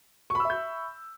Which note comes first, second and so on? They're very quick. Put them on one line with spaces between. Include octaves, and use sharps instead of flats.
C#6 B5 E6 E5 G6